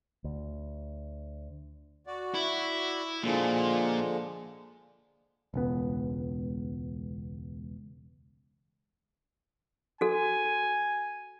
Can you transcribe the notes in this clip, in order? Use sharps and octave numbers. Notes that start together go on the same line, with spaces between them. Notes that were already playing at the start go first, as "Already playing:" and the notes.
D2
F#4 D5
E4
A#2 D3 F3 G#3
E1 C#2 B3
F#4 A4 G#5